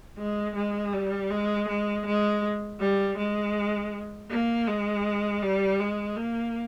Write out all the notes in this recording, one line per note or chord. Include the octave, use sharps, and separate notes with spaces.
G#3
G#3
G3
G#3
G#3
G#3
G3
G#3
A#3
G#3
G3
G#3
A#3